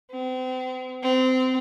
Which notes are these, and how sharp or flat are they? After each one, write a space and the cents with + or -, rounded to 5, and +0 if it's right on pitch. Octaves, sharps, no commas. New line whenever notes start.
C4 -35
C4 -25